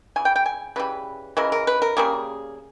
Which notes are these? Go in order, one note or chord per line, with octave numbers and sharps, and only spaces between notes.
C#3 E3 G#5
G5
G5
G#5
C#3 E3 G3 B4
C#3 E3 G#3 A#4
A#4
B4
A#4
C#3 G3 A#3 G#4